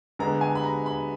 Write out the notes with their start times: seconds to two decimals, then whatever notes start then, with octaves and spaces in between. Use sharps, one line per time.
0.19 D3 G#3 B3 A#5
0.41 G#5
0.55 B5
0.63 A#5
0.86 B5